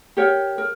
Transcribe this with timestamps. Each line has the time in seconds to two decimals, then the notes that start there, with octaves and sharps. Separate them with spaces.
0.17 G4 A#4 C#5 F#5
0.58 A#4